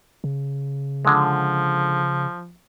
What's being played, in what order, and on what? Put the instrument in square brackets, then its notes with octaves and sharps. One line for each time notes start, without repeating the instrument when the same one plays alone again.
[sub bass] C#3
[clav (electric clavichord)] D3 G#3 [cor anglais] F3